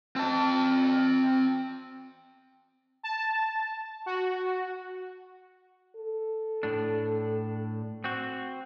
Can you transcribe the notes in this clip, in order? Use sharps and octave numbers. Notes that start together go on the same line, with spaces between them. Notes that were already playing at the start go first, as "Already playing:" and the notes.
C4 A5
A5
F#4
A4
A2 D4
C4 F#4